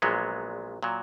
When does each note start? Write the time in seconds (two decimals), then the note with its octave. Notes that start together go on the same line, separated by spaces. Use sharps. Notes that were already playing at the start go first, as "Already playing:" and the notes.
0.02 A#1 A#2 F#3 G#3 B3
0.83 A#2 F#3